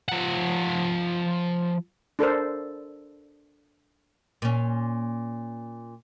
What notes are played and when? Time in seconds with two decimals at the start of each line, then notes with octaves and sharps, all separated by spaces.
0.08 F3 F#5
2.19 D4 A4 A#4 C5
4.42 A#2 C#4